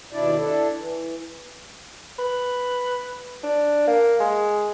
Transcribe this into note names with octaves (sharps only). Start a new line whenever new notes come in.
D#2 B2 D4 E4 D5
D4 E4 A4
E3
B4
D4
A#3
G#3